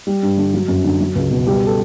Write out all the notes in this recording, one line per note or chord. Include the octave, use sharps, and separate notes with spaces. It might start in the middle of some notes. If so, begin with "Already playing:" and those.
G3
G2
D3
F#3
F#2
D3
F#3
C#2
B2
G3 G4
A4